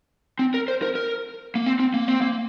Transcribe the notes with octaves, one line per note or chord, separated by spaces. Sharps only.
C4
A#4
C5
A#4
A#4
A#3
C4
C4
A#3
C4
A#3